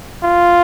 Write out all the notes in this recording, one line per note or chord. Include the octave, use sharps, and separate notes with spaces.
F4